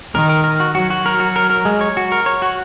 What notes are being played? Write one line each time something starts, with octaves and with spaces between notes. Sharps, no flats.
D#3 A#4
A#4
A#4
F#4
F#3 F#4
F#4
A#4
F#4
A#4
A#4
G#3
C#5
F#4
A#4
C#5
F#4